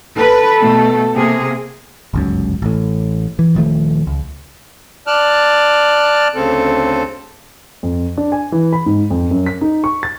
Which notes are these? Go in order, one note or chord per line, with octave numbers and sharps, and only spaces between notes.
A4 B4
B2 A3
C3 A#3 G#4
G1 C#2 F#2
A1 A2
E3
D#1 D#3 F3 A3
C#2
D5 A5 F6 F#6
D2 C#3 C4 A4
F2
D4
G#5
E3
B5
G#2
F2
F#2
B6
D#4
C#6
A6